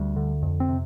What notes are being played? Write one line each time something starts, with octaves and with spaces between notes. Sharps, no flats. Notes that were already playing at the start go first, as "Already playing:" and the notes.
Already playing: D2 G3
D3
F2
C4
C3